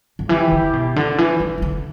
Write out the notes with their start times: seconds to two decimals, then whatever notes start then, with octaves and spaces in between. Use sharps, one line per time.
0.19 D3
0.29 E3 E4 G4
0.52 D3
0.73 B2
0.96 D3
1.18 E3
1.40 E3
1.58 E3
1.62 D3